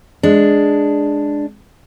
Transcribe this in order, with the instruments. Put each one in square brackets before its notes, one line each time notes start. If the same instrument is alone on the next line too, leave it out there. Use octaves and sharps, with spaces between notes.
[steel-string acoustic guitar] G#3 D4